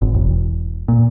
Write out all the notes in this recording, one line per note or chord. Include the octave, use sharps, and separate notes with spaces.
G#1
E1
A#2